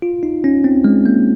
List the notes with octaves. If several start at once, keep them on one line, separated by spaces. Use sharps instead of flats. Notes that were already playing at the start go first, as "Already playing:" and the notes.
F4
D#4
C#4
C4
G#3
A#3